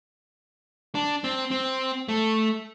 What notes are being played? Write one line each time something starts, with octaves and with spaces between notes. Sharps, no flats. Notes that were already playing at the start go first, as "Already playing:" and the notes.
D4
C4
C4
A3